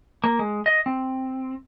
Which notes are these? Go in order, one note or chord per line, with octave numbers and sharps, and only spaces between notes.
A#3
G#3
D#5
C4